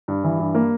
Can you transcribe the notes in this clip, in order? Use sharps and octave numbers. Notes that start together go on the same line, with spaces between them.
G2
E3
G2
A#3